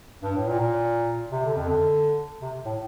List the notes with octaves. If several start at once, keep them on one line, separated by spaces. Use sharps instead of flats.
G2
A2
A#2
A#2
C3
D3
F2
D3
C3
A2